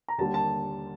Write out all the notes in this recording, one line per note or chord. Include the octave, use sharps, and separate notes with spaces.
A#5
D#2 D3 G3 A5
A5